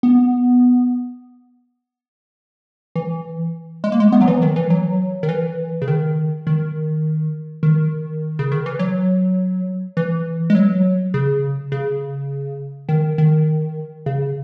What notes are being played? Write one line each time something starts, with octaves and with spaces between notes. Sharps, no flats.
B3
E3
G#3
A#3
G#3
B3
F#3
E3
D#3
E3
F#3
D#3
E3
C#3
D#3
D#3
D#3
C#3
D#3
E3
F#3
E3
G#3
F#3
C#3
C#3
D#3
D#3
C#3